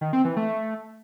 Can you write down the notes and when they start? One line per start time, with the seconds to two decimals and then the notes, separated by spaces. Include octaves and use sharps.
0.01 D#3
0.13 C4
0.25 E3
0.37 A3